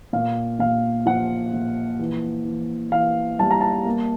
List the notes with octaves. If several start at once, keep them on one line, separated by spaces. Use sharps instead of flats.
A#2 F5
A#2 F5
F3 F#5
A#2
E3
E3
E3 F5
G3 A5
A#5
A5
A#3